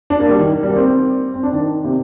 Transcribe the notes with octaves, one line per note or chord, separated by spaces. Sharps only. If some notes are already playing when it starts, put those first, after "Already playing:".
D4
A#3
G3
D#3
G3
A#3
C4
C4
D4
D#3
C3